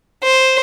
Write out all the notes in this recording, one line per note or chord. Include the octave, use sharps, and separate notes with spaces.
C5